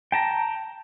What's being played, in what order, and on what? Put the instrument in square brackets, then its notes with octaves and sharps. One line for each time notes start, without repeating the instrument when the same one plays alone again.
[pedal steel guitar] G5 A5 A#5